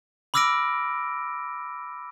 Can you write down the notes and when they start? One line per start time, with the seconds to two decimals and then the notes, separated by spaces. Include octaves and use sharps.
0.34 B5 D6 E6 F6 A#6 D7